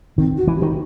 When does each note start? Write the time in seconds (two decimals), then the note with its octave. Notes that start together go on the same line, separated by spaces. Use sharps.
0.18 D#3 C4
0.37 F#4
0.47 E3
0.57 G4
0.62 D#3